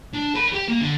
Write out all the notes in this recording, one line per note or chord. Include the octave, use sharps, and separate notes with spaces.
D4
A#4 B5
G4 G5
A#3
D3